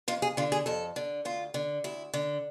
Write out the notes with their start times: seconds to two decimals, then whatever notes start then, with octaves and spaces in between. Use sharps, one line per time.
0.08 F2 F4
0.22 G#4
0.37 D3 F4
0.52 G#4
0.66 F2 A4
0.96 D3
1.25 D2 F4
1.54 D3
1.84 D2 E4
2.14 D3